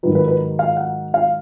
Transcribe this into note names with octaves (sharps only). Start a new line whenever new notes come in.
G#2 D#3 F#3 B4
B4
B4
F5
F#5
F5